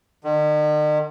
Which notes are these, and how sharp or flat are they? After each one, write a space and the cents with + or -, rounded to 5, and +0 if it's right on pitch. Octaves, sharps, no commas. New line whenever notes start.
D#3 -45